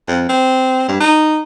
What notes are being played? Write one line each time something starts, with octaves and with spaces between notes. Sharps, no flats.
F2
C4
G2
D#4